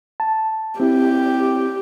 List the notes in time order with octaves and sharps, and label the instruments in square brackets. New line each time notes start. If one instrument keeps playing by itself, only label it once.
[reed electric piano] A5
[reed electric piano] C4 E4 [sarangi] G4